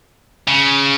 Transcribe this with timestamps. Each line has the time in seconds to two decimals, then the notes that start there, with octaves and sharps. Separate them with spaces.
0.48 C#3